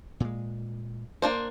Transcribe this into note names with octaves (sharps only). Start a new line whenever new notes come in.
A#2 G#3
A#3 D4 C5